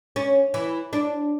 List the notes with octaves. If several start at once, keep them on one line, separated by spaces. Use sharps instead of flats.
C#4
E3
D4